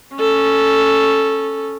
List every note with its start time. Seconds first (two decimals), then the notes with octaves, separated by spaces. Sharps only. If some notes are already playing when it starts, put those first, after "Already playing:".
0.16 C#4 A4